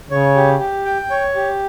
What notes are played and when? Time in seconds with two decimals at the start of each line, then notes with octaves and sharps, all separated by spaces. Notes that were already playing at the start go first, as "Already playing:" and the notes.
0.11 C#3 C#5
0.36 G4
0.60 G4
0.85 G5
1.10 C#5
1.35 G4